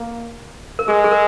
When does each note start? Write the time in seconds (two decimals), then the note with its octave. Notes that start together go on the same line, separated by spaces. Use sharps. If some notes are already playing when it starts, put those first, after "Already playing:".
Already playing: A#3
0.79 A#4
0.88 G#3 G#4
1.04 G#4
1.11 A#4